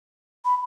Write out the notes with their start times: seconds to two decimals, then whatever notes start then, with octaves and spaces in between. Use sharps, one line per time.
0.45 B5